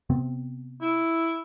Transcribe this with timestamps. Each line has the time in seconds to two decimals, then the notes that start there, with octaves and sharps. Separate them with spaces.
0.10 C3 B3 C4
0.81 E4